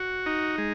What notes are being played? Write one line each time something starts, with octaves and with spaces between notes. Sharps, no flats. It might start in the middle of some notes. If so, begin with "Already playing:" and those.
Already playing: F#4
D#4
G#3